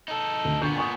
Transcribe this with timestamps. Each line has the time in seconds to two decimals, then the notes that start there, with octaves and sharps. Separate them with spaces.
0.08 D#4 A4
0.45 D2
0.62 A#2 D3 B3 C#6 G6
0.76 G#5 C#6 D#6